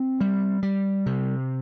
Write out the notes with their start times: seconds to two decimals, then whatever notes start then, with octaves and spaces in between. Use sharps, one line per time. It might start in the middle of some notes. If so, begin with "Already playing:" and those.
Already playing: C4
0.21 G3
0.63 G3
1.06 C3